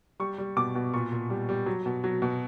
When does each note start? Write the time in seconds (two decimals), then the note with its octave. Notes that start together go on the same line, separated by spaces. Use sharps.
0.20 G3 C#6
0.38 G3
0.57 B2 D6
0.75 B2
0.94 A#2 C#6
1.12 A#2
1.30 G3
1.49 G3
1.66 F#3
1.86 B2
2.04 F#3
2.22 B2